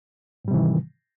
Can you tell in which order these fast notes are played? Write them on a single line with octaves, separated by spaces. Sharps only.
G#2 G3 C3 E3 D#3